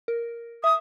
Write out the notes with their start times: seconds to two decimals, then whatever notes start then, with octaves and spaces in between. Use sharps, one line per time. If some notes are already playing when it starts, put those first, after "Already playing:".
0.08 A#4
0.64 E5 D#6